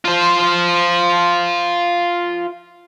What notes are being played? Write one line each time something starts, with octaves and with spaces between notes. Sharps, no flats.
F4 C5